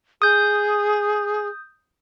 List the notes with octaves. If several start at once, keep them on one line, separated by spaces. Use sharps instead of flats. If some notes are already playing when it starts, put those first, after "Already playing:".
G#4 D#6 G6